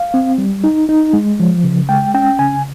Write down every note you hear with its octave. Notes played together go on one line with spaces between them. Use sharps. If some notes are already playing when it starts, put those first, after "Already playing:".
Already playing: F5
C4
G3
D#4
D#4
G#3
F3
C#3
G#3 G5
C#4 G5
C#3 G#5